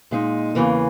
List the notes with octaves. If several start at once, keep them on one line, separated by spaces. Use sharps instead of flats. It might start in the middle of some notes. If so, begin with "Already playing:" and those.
A#2 G#3 D#4
E2 C#3 E3 A#3